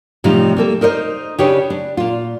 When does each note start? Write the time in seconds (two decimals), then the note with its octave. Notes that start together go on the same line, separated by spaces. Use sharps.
0.24 A2 C3 F3 G3 D#4 F4
0.57 G3 A#3 A4
0.81 D#4 A#4 C5 D5 D#5
1.38 C#3 D4 D#4 G4 B4 C#5
1.70 D4
1.97 A#2 F4